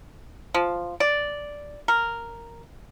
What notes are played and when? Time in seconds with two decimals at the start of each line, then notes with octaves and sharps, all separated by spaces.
0.54 F3
1.00 D5
1.88 A#4